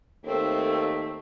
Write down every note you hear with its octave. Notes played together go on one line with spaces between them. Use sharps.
D#2 A3 C4 A4